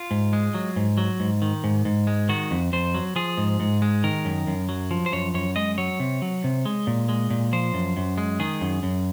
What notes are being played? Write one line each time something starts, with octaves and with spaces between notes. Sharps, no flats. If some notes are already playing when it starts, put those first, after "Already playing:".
Already playing: F4
G#2
G#3
F#3
G#2
F#3
G#2
D#3
G#2
G#2
G#3
D#3 F#4
F2
F2 C5
F#3
F3 G#4
G#2
G#2
G#3
D#3 A#4
F#2
F#2
F#3
F3
C5
F#2 C#5
F#2 C#5
G#3 D#5
F#3 C#5
C3
F#3
C3
G#3
A#2
G#3
A#2
F3 C5
F#2
F#2
G#3
D#3 G#4
F#2
F#2